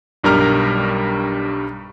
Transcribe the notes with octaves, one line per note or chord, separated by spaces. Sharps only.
B1 G2 G3 A#4 A#5 F6